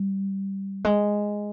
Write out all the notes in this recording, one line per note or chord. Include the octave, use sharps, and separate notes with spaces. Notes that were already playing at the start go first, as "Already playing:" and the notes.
Already playing: G3
G#3